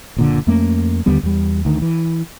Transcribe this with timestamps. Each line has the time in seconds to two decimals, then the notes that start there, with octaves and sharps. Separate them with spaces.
0.17 F#1 A#2 D3
0.47 F2 A3 A#3 C#4
1.06 D#2 D3 G3 B3
1.23 E2 G3
1.65 D2 D#3
1.82 E3